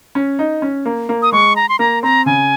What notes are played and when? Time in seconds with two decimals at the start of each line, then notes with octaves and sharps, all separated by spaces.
0.15 C#4
0.39 D#4
0.62 C#4
0.86 A#3
1.09 A#3
1.22 D#6
1.32 G#3 C#6
1.56 A#5
1.69 C6
1.79 A#3 A#5
2.03 C4 A#5
2.26 C#3 G#5